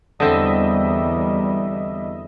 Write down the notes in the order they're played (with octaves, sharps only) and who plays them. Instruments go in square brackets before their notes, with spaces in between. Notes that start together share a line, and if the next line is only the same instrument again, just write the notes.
[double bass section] E2 G3 [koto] D3 C4 [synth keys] D#5 E5